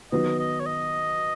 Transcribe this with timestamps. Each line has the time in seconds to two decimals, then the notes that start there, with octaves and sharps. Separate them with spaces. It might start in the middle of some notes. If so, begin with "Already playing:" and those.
0.12 D#3 F#3 B3 D#4 D#5
0.39 D#5
0.60 C#5
0.66 D#5